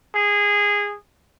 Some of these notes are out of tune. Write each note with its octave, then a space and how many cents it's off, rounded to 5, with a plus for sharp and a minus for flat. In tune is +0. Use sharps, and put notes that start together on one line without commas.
G#4 -15